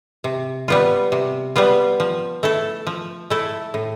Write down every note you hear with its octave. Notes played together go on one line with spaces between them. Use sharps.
C3
G3 B3 F4
C3
G3 B3 F4
F3
A3 E4 A4
F3
A3 E4 A4
A2